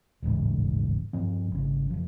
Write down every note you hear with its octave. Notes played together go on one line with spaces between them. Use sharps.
D#1 A1 G#2 C#3
G2 F3 C4
G#1 C#3
F1 F3